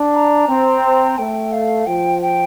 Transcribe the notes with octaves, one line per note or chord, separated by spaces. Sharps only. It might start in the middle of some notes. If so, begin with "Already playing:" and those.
Already playing: D4
A#5
C4
A3 G5
F5
F3 G5
G5